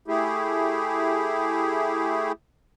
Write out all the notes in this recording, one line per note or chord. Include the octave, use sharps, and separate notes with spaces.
A3 E4 G4 G#4